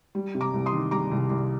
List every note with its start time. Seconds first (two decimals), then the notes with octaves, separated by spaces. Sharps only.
0.15 G3
0.35 C3
0.41 A#5 D6
0.54 C2
0.66 C6 D#6
0.72 D#3
0.91 G3 A#5 D6
1.11 C2
1.30 C2